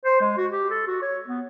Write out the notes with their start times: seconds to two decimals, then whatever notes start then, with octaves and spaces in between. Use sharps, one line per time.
0.05 C5
0.21 G#3
0.37 F#4
0.51 G4
0.70 A4
0.87 F#4
1.02 C#5
1.28 B3